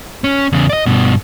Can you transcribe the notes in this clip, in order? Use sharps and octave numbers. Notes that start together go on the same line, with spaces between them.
C#4
E2 C#3
D5 D#5
G2 B2